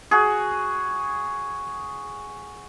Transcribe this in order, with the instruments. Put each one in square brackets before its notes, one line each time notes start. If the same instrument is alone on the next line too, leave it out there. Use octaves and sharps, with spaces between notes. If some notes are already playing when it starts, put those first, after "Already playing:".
[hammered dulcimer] F#4 G#4